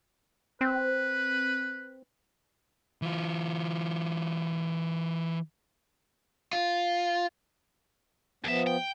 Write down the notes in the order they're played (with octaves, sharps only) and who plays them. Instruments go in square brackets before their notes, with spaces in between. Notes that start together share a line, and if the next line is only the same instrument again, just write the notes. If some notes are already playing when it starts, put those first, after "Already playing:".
[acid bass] C4 [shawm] B4
[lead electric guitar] E3 F4
[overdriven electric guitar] F4
[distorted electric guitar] D#2 E5 [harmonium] F3 B3
[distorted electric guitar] G5